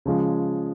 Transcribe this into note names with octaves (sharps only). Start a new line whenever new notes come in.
C#3 F3 G#3